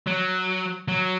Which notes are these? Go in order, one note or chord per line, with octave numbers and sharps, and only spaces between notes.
F#3
F#3